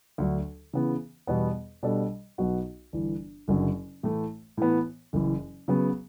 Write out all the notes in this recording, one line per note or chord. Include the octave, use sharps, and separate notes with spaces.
D2 D3 F#3
C#3 E3 B3
E2 B2 G3 B3
B2 G3 D4 A4
B1 B2 F#3 B3 F#4
G1 G2 E3
F#1 F#2 D3 F#3
A2 E3 A3
A2 E3 B3
F#1 F#2 E3
C#3 F#3 B3